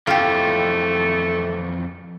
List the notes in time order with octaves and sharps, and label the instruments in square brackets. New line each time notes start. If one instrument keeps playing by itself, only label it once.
[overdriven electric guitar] F2 E3 [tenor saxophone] A3 [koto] F4 G4